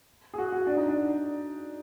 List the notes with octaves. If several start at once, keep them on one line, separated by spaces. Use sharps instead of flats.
G#4
F#4
F#4
D4
D#4
D4